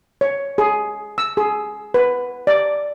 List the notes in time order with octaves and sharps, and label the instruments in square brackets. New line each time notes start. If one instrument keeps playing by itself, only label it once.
[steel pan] C#5
G#4
E6
G#4
B4
D5